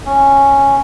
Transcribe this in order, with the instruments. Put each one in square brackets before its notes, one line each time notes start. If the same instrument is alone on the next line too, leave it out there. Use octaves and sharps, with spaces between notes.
[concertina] C#4